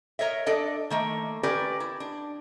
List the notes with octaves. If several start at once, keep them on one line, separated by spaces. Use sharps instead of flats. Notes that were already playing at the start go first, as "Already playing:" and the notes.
A#4 C#5 D#5 E5
D4 A4 D5 D#5
D#3 A3 A#3
C#4 G4 A#4 B4 D5
E4
D4